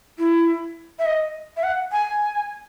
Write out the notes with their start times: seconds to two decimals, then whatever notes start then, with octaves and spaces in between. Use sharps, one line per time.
0.18 E4
0.99 E5
1.05 D#5
1.57 E5
1.63 F#5
1.92 G#5